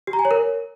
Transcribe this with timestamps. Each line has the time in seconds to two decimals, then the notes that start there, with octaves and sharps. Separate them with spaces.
0.07 G4
0.13 A#5
0.19 G#5
0.25 C#5
0.31 A#4